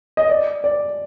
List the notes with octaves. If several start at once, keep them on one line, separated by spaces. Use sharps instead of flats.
D#5
D5
D5